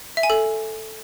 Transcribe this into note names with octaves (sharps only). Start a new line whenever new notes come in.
E5
G#5
A4